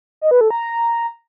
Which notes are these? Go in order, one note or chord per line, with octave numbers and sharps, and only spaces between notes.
D#5
B4
A4
A#5